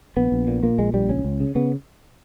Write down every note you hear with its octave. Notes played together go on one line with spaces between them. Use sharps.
A#1 B3
A#1
A#2
A#2 A#3
A#1 G#3
A#1 G3
C#2 C#4
C#2
C#3
C#3 B3